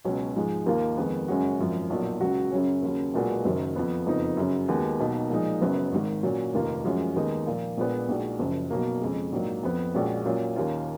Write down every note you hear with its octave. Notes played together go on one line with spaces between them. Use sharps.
C#2 B2 F#3 C#4
G#2 F3 G#3
D#2 D#3 A#3 F4
F2 D#3 G#3 B3
F#2 C#3 G#3 C#4 F#4
G#1 F#2 F3
B1 A#2 F#3
C#2 C#3 F#3 C#4 F#4
F#2 C#3 F#3 C#4
D#2 C#3 F#3 C#4
B1 A#2 G#3 B3 F#4
F#1 F#2 D#3 F#3
F2 F3 B3
F#1 F2 F3 B3 D#4
F#2 C#3 F#3
D#2 D#3 G#3 B3 F#4
B1 B2 A#3 D#4
A#2 F3 G#3 D#4
F#1 F#2 C#3 F#3 B3
G#1 G#2 D#3
A#2 F#3 C#4 F#4
F1 D#2 D#3 A#3 F4
F#2 F3 G#3 C#4 F#4
D#2 D#3 G#3 B3 D#4
A#2 F3 A#3 F4
A#1 A#2 G#3 B3
A#1 A#2 G#3 D#4 F#4
F#1 F#2 C#3 F3
B1 B2 F#3 A#3
F2 C#3 G#3
A#1 G#2 F#3 A#3
F2 F3 B3
A#1 A#2 G#3 C#4 F#4
A#2 F#3 C#4 F4
D#2 D#3 A#3 C#4 F4